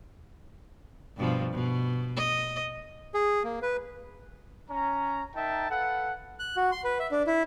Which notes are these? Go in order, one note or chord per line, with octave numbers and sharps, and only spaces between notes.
G2 B2 F3
B2
D#5
G#4
A#3
B4
C#4 A#5
D#4 A#4 E5 G5 A5
A4 B4 F5 F#5
F#6
F#4
C6
B4
E5
D4
E4